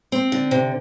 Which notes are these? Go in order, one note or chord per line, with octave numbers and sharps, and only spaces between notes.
C4
D3
C3